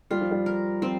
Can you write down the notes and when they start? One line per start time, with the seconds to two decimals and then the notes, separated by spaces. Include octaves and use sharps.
0.11 G3 F4
0.21 F3
0.31 G3
0.46 A#4
0.82 F3 C4